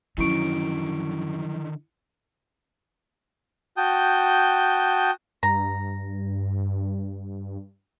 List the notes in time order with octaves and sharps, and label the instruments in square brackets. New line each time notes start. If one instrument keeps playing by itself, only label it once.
[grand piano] F#2 C#6 [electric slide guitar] D3 D#3 [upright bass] F3 F#3 [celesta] E4 D7
[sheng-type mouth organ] F#4 G5 A5 D#6 G6
[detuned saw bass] G2 [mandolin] A#5